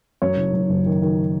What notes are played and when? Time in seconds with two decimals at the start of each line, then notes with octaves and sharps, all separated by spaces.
0.22 F#2 C#5
0.37 F#1
0.53 F#1
0.70 F#1
0.86 D#3
1.02 D#3